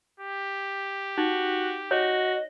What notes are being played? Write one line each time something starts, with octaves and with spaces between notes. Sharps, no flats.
G4
D#4 F#4
F#4 C#5 D#5